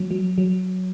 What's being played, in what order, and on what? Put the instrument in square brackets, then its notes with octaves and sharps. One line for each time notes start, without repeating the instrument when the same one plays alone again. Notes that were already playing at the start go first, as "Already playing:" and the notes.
Already playing: [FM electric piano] F#3
F#3
F#3